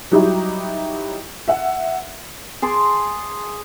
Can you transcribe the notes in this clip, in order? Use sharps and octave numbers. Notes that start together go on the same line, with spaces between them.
F#3 G3 D#4 E4 G4
E5 F#5
G#4 A5 C6 D6